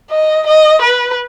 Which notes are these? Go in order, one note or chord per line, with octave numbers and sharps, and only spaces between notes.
D#5
D#5
B4